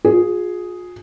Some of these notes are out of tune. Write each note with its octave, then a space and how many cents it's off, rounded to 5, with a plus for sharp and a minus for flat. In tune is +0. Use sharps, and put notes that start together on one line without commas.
F4 +40 G#4 +0